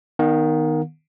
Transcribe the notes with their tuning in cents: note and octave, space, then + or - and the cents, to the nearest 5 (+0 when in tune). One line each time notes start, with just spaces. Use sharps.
D#3 +0 B3 +0 F5 +45